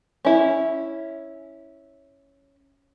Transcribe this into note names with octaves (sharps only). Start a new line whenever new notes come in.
C#4 E4